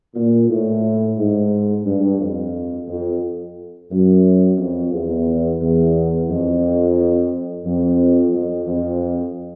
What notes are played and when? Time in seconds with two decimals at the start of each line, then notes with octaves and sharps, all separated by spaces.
0.15 A#2
0.49 A2
1.17 G#2
1.85 G2
2.19 F2
2.88 F2
3.90 F#2
4.58 F2
4.92 E2
5.61 E2
6.29 F2
7.65 F2
8.33 F2
8.67 F2